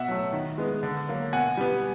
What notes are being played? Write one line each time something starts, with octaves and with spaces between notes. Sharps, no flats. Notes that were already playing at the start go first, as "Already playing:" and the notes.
Already playing: B2 E5 F#5
F#3 A3
D#3
G#3 B3
D3
F#3 A#3
B2 F#5 G#5
G3 B3